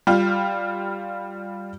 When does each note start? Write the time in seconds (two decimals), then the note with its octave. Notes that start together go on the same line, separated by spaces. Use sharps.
0.07 G3 F4